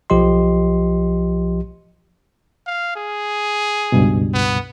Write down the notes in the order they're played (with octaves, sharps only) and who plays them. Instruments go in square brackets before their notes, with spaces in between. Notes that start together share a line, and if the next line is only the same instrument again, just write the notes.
[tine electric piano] B1 F3 G4 D#5 C6
[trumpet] F5
G#4
[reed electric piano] C#2 G2 B2
[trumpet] B3